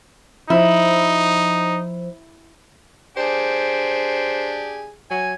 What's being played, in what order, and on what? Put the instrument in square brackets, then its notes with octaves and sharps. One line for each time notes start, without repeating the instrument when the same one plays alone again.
[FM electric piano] F3 C5 [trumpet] D#4 [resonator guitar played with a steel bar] E4
[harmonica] D4 G4 G#4 [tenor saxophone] C5
[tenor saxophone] F#3 [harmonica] G#5